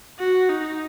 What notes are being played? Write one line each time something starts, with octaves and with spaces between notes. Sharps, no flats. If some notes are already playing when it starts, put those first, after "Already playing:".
F#4
D#4